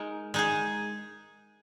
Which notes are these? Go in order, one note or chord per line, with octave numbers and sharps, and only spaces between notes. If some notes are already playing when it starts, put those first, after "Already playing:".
Already playing: G#3 D#4 A#4
G#3 D#4 G#4